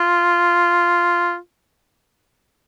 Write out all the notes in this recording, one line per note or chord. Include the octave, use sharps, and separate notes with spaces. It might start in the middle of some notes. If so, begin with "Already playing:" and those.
Already playing: F4